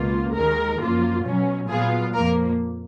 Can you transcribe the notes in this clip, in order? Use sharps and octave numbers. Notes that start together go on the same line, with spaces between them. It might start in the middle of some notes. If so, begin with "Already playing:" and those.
Already playing: C#2 B2 A#3 F4
D#2 D#3 G#3 A#4
F#2 F3 A#3 F4
B2 F#3 C#4
A#2 F#3 B3 F4 G#4
F2 F3 A#3 A#4